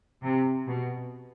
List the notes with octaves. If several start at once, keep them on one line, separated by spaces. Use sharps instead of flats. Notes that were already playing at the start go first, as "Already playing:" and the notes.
C3
B2